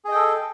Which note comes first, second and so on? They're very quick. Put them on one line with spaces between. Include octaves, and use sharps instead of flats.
G#4 D#5 G5 A4